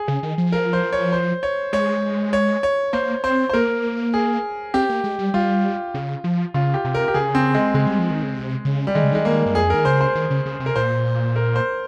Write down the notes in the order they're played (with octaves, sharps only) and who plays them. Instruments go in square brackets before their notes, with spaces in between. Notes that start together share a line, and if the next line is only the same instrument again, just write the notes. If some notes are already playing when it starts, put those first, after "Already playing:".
Already playing: [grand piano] G#4
[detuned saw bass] C#3
D#3
F3
[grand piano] A#4
C5
C#5
C5
C#5
[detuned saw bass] G#3 [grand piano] C#5
[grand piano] C#5
C#5
[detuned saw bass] A#3 [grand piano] C5
[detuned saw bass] C4 [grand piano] C5
[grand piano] C5
[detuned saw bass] A#3 [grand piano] A#4
[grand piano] G#4
[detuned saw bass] C4 [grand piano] G4
[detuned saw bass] A#3
G#3
G3
[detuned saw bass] G3 [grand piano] F4
[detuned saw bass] C#3
F3
[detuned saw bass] C#3 [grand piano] F4
[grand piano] G4
[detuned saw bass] C3
[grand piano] A#4
G4
[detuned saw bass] C#3 [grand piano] G#4
[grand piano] C4
G#3
[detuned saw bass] C#3 [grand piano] G#3
[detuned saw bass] G3
F3
D#3
C#3
C3
C#3
[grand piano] G3
[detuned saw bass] D#3 [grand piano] G#3
[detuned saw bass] C#3
[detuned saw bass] D#3 [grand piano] G#3
[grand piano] A#3
[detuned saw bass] G2
[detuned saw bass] F2 [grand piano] G#4
[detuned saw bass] D#3 [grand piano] A#4
[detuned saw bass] C#3 [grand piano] C5
[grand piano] C5
[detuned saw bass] D#3
C#3
C#3
C3
[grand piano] A#4
[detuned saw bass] A#2 [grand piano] C5
[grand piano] A#4
C5